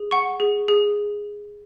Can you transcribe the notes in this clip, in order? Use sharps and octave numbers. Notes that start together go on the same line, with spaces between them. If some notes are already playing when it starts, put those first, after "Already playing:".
Already playing: G#4
F#5 C#6
G#4
G#4